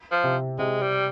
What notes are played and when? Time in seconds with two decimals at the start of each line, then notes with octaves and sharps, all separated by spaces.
0.12 F3
0.24 C3
0.58 C3 G#3
0.82 G3